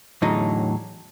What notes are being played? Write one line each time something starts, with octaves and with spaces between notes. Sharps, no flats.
E2 A2 D3 F#3 D#4